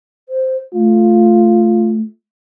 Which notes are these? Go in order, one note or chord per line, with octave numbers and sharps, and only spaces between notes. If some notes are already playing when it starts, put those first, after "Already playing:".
C5
A3 F4